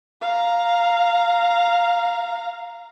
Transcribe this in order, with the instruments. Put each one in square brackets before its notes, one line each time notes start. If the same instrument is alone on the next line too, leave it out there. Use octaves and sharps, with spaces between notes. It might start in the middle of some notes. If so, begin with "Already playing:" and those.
[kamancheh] F5 A#5